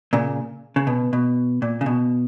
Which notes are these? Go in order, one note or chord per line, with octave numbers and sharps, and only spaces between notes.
A#2 C#3
C#3
B2
B2
A#2
C#3
B2